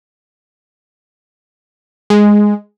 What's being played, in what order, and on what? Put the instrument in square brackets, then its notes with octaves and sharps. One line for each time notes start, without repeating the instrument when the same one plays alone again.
[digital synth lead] G#3